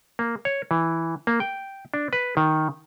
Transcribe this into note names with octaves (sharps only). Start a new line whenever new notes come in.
A#3
C#5
E3
A#3
G5
D4
B4
D#3